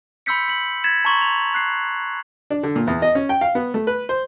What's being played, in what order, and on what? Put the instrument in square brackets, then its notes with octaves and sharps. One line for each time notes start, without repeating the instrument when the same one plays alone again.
[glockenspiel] B5 C6 E6 G6 B6 C#7
B6 F#7
G#6 A6 B6 E7
A5 A#5 C6 C#6 G#6 F#7
F7
F#6 C7
[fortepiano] D4
D3
A#2
E2
D#5
C#4
G5
F5
B3
A3
B4
C5